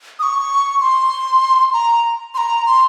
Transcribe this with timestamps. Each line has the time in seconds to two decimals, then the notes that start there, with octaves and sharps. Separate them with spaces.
0.19 D#6
0.23 C#6
0.81 C6
1.73 A#5
2.34 C6
2.38 A#5
2.66 C6